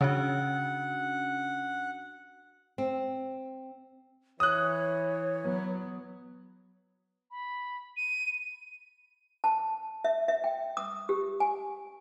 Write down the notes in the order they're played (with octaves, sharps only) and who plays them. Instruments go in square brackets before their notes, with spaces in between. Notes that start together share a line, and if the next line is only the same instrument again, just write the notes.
[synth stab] C#3 [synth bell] C#4 D4 F#4 [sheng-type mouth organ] F#5
[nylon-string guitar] C4
[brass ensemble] E3 [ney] C#5 [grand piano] D#6 F#6
[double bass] F#3 B3
[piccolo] B5
D#7
[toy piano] A5
E5
E5
G5
D#6
G4
G#5